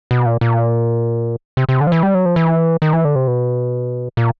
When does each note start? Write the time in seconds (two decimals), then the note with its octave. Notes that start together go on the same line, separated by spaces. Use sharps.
0.11 B2
0.26 A#2
0.41 A#2
1.57 C3
1.69 C3
1.81 D3
1.87 F3
1.92 E3
2.03 G3
2.14 F#3
2.25 F3
2.36 E3
2.82 D#3
2.93 E3
3.05 D3
3.15 C3
3.27 B2
4.17 A#2